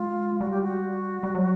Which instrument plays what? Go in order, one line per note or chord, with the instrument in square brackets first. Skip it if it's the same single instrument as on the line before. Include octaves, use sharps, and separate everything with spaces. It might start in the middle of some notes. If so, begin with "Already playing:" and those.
Already playing: [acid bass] G#3 [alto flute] F4
[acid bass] G3 [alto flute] F#4
[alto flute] G4
F#4
[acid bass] G3
F#3